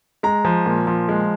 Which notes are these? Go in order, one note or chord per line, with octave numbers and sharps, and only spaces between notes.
G#3 A#5
F3
A#2
F3
G#3